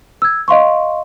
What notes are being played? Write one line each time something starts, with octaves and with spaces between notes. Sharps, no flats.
E6 G#6
D#5 F5 C6 C#6